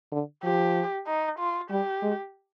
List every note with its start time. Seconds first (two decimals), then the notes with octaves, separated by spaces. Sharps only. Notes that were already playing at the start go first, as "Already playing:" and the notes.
0.12 D3
0.44 F3 G4
1.07 D#4
1.39 F4
1.70 G3 G4
2.02 G#3